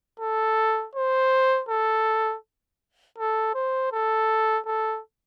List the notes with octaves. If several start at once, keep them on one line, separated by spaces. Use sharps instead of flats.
A4
C5
A4
A4
C5
A4
A4